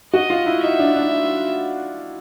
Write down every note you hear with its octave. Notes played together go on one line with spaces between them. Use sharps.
F#4 D#5
F4
E4
D#4 E5
D4
D4